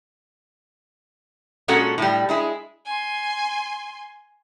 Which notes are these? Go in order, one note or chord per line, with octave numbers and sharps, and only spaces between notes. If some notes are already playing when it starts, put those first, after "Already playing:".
A#2 G#3 C#4 F#4 A4 F#5
A2 G3
G#3 E4 G#4
G#5 C6